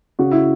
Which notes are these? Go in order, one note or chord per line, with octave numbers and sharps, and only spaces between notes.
C#3 F#4
E4